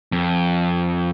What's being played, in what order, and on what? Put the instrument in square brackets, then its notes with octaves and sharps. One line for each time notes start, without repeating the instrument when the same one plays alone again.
[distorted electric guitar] F2